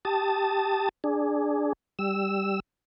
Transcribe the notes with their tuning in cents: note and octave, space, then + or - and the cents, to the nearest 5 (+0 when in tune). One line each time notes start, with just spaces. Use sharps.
G4 +0 A5 +0 D#6 +0
D4 +0 G#4 +0
G3 +0 E6 +0